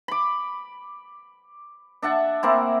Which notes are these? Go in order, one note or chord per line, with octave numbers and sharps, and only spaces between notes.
B5 D6
D4 E5 F#5 A5
A#3 C4 E4